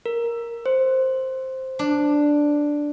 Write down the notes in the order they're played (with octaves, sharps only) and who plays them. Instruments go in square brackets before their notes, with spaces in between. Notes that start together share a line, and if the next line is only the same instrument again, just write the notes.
[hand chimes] A#4
C5
[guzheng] D4